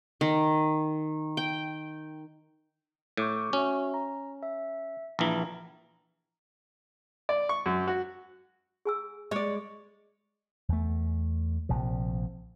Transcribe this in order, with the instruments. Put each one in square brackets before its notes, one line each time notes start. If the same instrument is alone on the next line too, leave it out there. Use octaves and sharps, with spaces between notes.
[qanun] D#3
G5
[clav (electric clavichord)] A2 [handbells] C#6 D6 G6
[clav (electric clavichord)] C#4 [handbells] F#4 E5
[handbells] A#5
E5
[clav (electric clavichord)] A#1 E3 [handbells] A#5
[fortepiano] D5
C#6
F#2
F#4
[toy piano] G#4 G#5 E6
[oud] G#3 [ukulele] C#5 D5
[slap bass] E2 A3
A#1 C3 F3